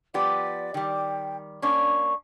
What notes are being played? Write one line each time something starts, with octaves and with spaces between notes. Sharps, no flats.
F3 B3 G4 D5
D#3 G3 G5
A#3 C#4 D4 C#6